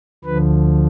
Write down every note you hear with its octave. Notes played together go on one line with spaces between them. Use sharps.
D2 D3 F3 B4